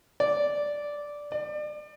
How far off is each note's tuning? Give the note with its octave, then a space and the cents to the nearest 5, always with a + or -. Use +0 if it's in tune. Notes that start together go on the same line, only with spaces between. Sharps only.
D5 -5
D5 +35